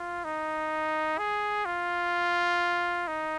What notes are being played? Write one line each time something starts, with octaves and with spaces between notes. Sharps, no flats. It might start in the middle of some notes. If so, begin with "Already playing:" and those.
Already playing: F4
D#4
G#4
F4
D#4